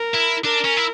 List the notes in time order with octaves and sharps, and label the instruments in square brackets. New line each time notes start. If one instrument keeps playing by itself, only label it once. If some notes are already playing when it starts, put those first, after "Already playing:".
Already playing: [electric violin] A#4
[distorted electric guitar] E4
[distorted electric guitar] D4 [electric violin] A#4
[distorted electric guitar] C#4
E4